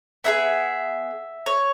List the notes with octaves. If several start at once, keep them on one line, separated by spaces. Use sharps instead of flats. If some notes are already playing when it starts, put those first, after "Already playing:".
B3 E4 G#4 E5
C#5